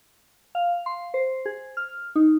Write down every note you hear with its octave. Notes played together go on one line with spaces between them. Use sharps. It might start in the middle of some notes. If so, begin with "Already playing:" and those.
F5
C6
C5
G#4
F6
D#4